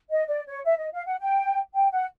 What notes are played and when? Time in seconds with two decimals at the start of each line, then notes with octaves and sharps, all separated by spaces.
0.11 D#5
0.28 D5
0.47 C#5
0.65 E5
0.79 D#5
0.93 F5
1.06 F#5
1.20 G5
1.74 G5
1.93 F#5